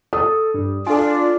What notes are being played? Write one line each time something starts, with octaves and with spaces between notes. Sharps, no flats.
A4 D#6
G2
D4 F4 A4 G#5